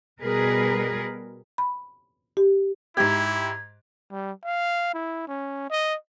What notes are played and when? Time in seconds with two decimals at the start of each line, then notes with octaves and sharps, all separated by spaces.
0.21 B2 G3 G#4 A#4 B4
1.58 B5
2.37 G4
2.97 G#2 E4 G4 G#6
4.11 G3
4.44 F5
4.94 E4
5.28 C#4
5.70 D#5